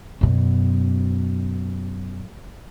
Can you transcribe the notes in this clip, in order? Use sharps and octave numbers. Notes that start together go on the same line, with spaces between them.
F#2 B2